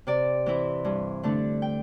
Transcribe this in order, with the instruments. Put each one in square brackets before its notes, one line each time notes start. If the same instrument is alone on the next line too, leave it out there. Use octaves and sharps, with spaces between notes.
[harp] C3 D5
E3 C4 E4
G2
D3 A3 D4
G5